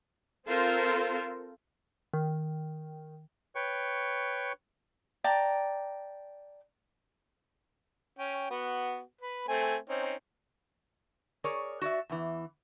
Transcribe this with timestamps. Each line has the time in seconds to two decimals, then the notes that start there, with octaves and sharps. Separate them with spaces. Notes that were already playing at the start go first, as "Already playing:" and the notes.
0.46 C4 F4 A4 A#4 C5
2.14 D#3
3.55 B4 C#5 G5 C#6
5.24 D5 G5 A5 A#5
8.19 C#4 G5
8.50 B3 F#4
9.21 B4
9.48 A3 C4 G#5
9.89 C4 C#4 D#4
11.44 G#4 A#4 C#5 D5
11.82 F#4 D5 E5
12.10 E2 E3